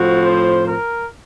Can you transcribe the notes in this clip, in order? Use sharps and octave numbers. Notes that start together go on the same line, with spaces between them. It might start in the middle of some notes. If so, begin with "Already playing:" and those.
Already playing: A2 F3 C4 F#4
C5
A#4